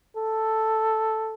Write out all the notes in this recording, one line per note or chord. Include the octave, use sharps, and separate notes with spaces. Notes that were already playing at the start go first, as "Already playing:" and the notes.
A4